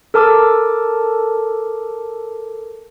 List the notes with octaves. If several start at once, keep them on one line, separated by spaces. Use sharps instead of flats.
A4 A#4 A5 D6 E6